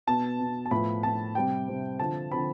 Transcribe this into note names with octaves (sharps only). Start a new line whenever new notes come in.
B2 B3 A5
B2 B3
A5
A2 F3 B3 B5
A2 F3 B3 A5
C3 G3 C4 G5
C3 G3 C4
D3 F3 C4 A5
D3 F3 C4 B5